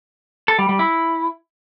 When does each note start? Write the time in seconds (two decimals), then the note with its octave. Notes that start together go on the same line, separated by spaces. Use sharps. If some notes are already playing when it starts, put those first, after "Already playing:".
0.48 A4
0.59 G3
0.69 G3
0.79 E4